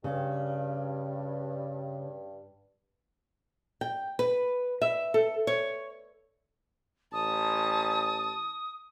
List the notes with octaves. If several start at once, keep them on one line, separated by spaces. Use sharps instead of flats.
G2 C#3
G5
B4
E5
A4
C#5
A1 A5 D#6